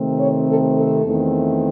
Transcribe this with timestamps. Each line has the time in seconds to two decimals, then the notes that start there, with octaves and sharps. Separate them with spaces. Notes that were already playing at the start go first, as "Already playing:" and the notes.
Already playing: C3 D#3 A3 C4
0.20 C#5
0.48 A4
0.77 A4
1.05 E2 D#3 A3 C4